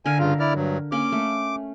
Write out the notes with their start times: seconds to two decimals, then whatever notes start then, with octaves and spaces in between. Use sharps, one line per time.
0.05 D3 A#4 F5 G#5
0.19 G2 C#3 F4
0.40 E4 D5 F6
0.55 G2 F#3
0.92 A#3 C#4 D6
1.12 A3